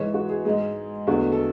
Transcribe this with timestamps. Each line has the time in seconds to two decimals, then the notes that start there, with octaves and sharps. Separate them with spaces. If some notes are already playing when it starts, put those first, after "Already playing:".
Already playing: G#2 E3 G#3 C#5
0.14 F#4
0.30 G#4
0.45 G#2 G#3 G#4
1.07 E2 D3 A3 F#4
1.32 A4